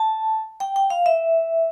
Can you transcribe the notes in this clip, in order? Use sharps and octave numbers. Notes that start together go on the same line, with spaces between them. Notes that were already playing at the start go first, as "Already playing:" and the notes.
Already playing: A5
G5
G5
F5
E5